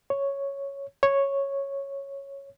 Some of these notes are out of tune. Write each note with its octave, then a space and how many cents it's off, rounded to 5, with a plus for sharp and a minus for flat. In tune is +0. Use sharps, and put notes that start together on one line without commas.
C#5 +0
C#5 -5